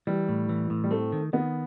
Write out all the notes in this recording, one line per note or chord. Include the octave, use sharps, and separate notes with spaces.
E3 G3
A2
E3
A2
G3
A3 C4
D#3
D#3 B3